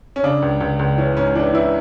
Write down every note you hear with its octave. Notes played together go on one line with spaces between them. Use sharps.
C#4
C#3 D4
C#2
C#2
C#2
E3 C#4
G#2 C#4
E3 D4
E3 E4